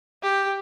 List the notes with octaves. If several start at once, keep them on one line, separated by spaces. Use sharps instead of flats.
G4